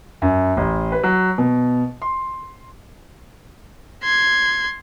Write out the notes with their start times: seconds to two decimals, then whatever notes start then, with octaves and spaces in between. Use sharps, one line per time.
0.22 F#2
0.57 A1
0.92 B4
1.03 F#3
1.38 B2
2.02 C6
4.03 C6 G#6